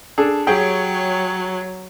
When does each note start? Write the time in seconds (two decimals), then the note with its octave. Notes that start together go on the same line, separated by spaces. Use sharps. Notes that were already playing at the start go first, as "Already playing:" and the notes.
0.18 D4 G#4 A4
0.47 F#3 G4 G#4 C#5 G5